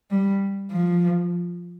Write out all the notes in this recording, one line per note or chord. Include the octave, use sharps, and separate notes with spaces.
G3
F3